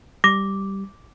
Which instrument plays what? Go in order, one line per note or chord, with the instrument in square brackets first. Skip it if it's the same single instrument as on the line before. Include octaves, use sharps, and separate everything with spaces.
[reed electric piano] G3 [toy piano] D6 [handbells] A#6